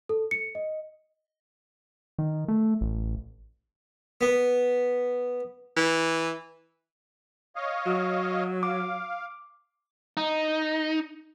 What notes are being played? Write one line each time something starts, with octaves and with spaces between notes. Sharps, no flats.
A4
C#7
D#5
D#3
A3
A1
B3
E3
C#5 D#5 F5
F#3
F5 D6
D#4